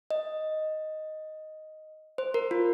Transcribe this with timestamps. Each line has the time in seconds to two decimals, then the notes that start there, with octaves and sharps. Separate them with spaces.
0.11 D#5
2.18 C5
2.34 A#4
2.51 F4